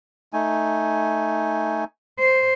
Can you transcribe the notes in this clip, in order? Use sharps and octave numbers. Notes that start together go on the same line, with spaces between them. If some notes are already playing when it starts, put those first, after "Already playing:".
A3 D#4 G#5
C5